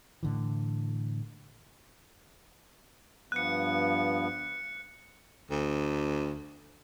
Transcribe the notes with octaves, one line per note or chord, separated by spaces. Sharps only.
A2 D3 E3
G2 F3 B3 F#6 C#7
D2